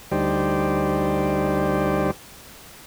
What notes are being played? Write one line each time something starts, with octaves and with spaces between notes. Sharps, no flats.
D2 G3 D#4 G4 C5 D5